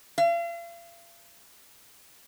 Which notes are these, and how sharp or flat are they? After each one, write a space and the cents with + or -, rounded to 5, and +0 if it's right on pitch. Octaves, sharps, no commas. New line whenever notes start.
F5 -40